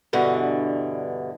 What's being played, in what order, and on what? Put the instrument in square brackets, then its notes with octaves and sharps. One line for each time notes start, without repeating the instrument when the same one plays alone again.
[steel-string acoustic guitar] G2 B2 D3 E3